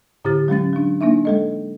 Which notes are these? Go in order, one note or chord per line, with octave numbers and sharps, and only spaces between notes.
A2 D3 E4 G4 A6
F#3 G#3 C#4 A6
F#3 D4
A#3 D4 D#4 E5
G#3 A4 D#5